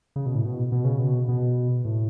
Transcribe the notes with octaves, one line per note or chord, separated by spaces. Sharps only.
C#3
B2
A2
B2
B2
C#3
B2
B2
A2